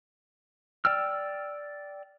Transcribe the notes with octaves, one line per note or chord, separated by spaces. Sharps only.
D5 G5 E6 F6